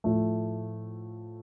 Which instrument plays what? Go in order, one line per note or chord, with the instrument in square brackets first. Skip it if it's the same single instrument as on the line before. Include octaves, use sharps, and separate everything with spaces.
[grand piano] A2 F3 A3